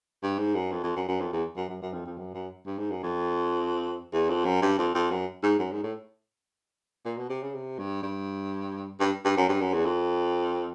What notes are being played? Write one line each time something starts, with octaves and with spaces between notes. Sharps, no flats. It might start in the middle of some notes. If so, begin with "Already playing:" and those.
G2
G#2
F#2
F2
F2
F#2
F#2
F2
E2
F#2
F#2
F#2
F2
F2
F#2
F#2
G2
G#2
F#2
F2
E2
F2
F#2
G2
F2
F2
F#2
G#2
F#2
G#2
A2
A#2
B2
C3
C#3
C3
G2
G2
G2
G2
F#2
G2
F#2
E2
F2